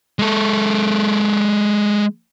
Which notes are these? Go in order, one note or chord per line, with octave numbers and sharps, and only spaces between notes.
G#3 A4